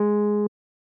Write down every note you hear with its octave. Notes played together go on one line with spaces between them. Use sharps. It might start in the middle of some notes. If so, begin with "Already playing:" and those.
Already playing: G#3